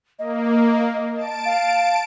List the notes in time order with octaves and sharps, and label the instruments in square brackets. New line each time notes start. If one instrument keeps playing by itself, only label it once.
[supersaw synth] A#3 [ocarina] D#5
[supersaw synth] A5 D7
[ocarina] F5